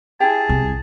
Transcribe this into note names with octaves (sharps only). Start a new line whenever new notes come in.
E4 G4 G#4 G5 A5
C2